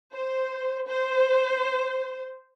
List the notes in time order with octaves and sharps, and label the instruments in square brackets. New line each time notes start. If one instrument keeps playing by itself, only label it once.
[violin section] C5
C5